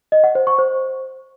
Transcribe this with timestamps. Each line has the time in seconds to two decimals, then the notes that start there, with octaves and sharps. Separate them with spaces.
0.12 D#5
0.24 F#5
0.35 C5
0.47 C#6
0.58 C5